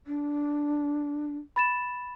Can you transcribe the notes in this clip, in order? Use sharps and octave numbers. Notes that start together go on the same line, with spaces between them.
D4
B5 A6 E7